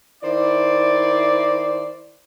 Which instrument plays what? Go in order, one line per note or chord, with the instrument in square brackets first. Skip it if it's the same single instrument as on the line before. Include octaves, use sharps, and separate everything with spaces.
[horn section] D#3 E4 C5 D5